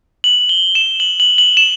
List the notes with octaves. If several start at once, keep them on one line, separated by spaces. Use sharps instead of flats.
F#7
G7
E7
F#7
F#7
F#7
E7